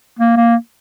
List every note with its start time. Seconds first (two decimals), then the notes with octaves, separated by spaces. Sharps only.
0.19 A#3
0.36 A#3